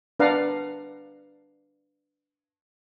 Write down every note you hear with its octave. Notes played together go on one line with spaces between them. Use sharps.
D4 B4 D5 F5 F#5 A#5